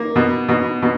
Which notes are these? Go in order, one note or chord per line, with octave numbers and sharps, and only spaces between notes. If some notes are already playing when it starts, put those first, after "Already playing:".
Already playing: A#3
B2
B2
B2